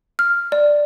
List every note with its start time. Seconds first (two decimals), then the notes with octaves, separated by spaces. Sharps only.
0.19 F6
0.52 D5